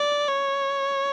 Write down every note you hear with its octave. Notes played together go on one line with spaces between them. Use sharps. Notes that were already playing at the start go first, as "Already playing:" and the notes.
Already playing: D5
C#5